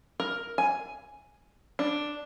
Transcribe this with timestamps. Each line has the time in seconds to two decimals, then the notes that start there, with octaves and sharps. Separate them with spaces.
0.20 A#4
0.58 G#5
1.79 D4